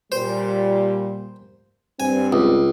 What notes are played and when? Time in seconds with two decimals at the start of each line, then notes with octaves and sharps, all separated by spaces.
0.12 A#2 G3 C5
2.00 G2 C4 G#5
2.33 C#2